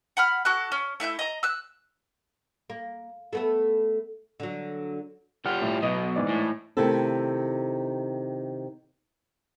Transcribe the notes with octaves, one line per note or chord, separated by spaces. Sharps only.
F#5 B5 F6
F#4 A4 F#6
C#4
A3 E4 E5 G6
D#5 A#5
E6 F#6
A#3
A3 B3 A4
D3 F#3
G3 F4 F#5 F6
A2
B2 F#3 D#5
G#2 E3 D5
A2
C3 D#3 A3 E4 A4